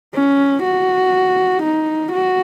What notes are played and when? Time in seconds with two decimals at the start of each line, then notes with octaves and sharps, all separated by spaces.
0.14 C#4
0.64 F#4
1.63 D#4
2.13 F#4